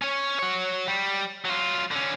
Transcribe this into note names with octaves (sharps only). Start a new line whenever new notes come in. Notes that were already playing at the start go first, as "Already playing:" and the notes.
C#4 C#5
F#3 C#5
G3
F#3 F4
D3 C#4